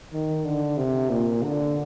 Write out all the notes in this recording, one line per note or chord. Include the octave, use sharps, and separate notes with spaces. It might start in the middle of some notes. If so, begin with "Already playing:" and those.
D#3
D3
C3
A#2
D3